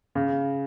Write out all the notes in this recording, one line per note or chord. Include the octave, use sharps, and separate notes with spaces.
C#3